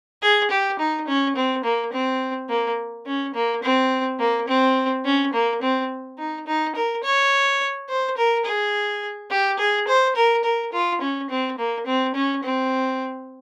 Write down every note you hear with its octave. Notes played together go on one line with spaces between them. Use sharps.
G#4
G4
D#4
C#4
C4
A#3
C4
A#3
C#4
A#3
C4
A#3
C4
C#4
A#3
C4
D#4
D#4
A#4
C#5
C5
A#4
G#4
G4
G#4
C5
A#4
A#4
F4
C#4
C4
A#3
C4
C#4
C4